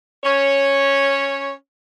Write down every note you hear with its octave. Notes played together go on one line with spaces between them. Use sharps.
C#4 C#5